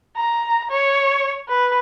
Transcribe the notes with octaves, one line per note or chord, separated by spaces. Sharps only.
A#5
C#5
B4